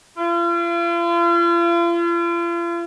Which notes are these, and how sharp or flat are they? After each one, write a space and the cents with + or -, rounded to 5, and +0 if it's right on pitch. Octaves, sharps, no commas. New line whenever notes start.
F4 -40